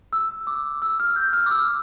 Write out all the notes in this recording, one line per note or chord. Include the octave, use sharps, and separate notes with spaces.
E6
D6
E6
F6
G6
F6
D6
E6